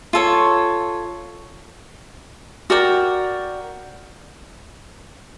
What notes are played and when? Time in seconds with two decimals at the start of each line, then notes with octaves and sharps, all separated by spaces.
0.13 F4 A4 C#5
2.70 F#4 A#4 D5 G5